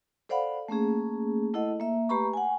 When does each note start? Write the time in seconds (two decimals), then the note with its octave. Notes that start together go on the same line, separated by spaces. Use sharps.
0.29 A4 C5 D5 F5 F#5 B5
0.68 A3 A#3 C#4 G#4
1.54 A3 E4 A4 D#5 F#5
1.80 A#3 E5
2.09 A3 G4 B4 A#5 B5 C#6
2.33 F#5 G#5